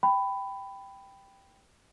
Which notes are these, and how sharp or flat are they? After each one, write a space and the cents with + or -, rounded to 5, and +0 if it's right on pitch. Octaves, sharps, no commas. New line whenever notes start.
G5 +0 B5 +15